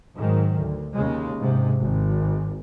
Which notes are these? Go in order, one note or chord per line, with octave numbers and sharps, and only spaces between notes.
G#2 D#3 F#3
D2
D#2 C#3 G#3
G#2 C3
G#1